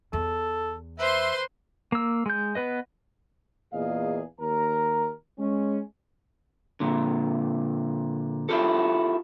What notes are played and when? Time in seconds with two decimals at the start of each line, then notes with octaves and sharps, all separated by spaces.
0.13 E2 A4
0.99 B4 C5 E5 C6
1.92 A#3 E6
2.26 G#3 G6
2.55 B3 B4 D#5
3.73 E2 A#2 A#3 G#4 D#5 F5
4.40 D#2 A#4 A#5
5.39 G#3 C#4
6.80 A#2 D3
8.49 E4 F4 G4 A4